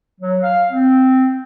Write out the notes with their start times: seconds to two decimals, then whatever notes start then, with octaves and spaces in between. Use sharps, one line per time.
0.21 F#3
0.42 F5
0.72 C4